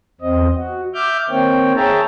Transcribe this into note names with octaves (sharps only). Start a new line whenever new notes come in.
E2 C4 D#5
F#4
E5 D6 F6 G6
D#3 A#3 C4 C#5 G5
G#4 C#5 E5 G5 A5 A#5